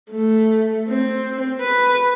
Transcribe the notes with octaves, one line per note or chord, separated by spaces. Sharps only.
A3
C4
B4